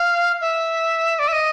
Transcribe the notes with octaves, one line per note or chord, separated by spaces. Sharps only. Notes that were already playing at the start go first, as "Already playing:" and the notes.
Already playing: F5
E5
D5
E5
D#5